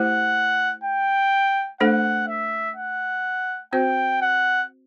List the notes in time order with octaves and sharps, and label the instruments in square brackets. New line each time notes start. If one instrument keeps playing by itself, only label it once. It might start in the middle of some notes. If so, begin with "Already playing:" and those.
Already playing: [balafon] A3 E4 G4 C5 [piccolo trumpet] F#5
[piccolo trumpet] G5
[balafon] A3 D4 A4 C5 [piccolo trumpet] F#5
[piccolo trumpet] E5
F#5
[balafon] C4 F#4 C5 [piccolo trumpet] G5
[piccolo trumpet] F#5